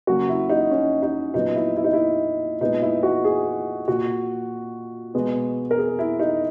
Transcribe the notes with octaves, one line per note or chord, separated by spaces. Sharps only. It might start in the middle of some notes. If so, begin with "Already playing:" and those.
C#3 F#3 A#3 F#4
E4
D#4
C#4
D#4
A#2 F#3 B3 D#4
E4
E4
D#4
E4
A#2 G#3 B3 D#4
E4
F#4
G#4
A#2 A#3 F#4
B2 G#3 B3
A#4
G#4
E4
D#4